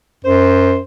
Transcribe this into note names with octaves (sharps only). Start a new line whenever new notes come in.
F#2 C5